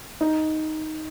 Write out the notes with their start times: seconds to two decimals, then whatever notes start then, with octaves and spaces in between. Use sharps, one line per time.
0.21 D#4